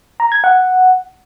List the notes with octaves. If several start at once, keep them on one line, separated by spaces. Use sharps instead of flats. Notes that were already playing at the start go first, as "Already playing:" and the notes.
A#5
G#6
F#5